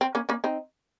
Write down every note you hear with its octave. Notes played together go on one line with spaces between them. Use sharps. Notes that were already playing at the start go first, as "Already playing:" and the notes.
C4
A#3 C#4
A#3 C#4
C4 D#4